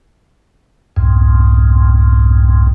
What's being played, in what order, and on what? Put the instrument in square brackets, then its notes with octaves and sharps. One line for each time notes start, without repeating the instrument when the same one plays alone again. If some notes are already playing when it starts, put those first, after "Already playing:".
[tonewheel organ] C2 F2 G#2